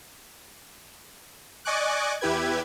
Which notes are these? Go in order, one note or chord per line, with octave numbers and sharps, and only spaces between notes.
D5 D#5 G#5 C#6 D6 F#6
E2 E4 G4 B4 G#6